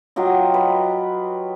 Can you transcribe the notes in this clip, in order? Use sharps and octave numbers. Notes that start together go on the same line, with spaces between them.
F#3 F4 G4 D#5
B4